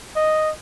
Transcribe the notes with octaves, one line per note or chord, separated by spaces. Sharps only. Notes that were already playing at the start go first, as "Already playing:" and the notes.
D#5